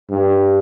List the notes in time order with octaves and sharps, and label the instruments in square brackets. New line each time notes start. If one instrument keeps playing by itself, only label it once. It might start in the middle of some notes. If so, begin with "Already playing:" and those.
[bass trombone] G2